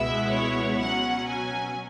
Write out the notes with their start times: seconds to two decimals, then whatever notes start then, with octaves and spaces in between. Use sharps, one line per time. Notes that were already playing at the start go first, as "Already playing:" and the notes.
Already playing: C#2 B2 G#3 B3 E4 E5
0.30 C#5
0.79 B2 F#3 C#4 F#5
1.27 G#5